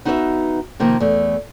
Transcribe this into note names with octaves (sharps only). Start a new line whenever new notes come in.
B3 D#4 F#4 B4 D5 E5
C3 D#3 F3 A#3
E2 A3